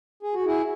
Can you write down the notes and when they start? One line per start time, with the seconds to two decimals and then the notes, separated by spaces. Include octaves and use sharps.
0.23 G#4
0.34 F#4
0.46 E4 G#4